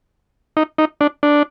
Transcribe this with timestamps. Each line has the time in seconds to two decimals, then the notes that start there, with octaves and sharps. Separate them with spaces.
0.57 D#4
0.78 D#4
1.01 D4
1.23 D4